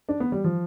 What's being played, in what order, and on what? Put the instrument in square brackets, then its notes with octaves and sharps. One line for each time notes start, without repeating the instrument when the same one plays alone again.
[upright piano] D4
B3
G3
F3